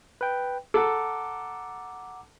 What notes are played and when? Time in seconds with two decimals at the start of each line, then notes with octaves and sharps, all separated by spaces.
0.21 B4 G5
0.74 A4 F#5 A#5 D6